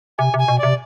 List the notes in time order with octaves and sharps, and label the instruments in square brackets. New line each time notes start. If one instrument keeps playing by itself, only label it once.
[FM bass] C3 [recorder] G#5
[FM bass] C3 [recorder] G#5
[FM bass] B2
[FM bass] C3 [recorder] D5